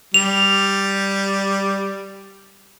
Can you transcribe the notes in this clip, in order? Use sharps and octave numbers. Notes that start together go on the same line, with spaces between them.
G3 F7